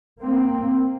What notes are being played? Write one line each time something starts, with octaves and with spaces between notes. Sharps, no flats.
A#3 C4